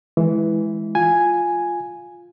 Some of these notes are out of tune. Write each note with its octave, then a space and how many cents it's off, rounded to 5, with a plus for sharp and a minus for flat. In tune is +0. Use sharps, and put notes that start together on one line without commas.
E3 +0 G#3 +15
F4 +0 G#5 +0